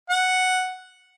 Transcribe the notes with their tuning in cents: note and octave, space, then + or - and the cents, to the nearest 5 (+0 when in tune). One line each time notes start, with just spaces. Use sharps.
F#5 +0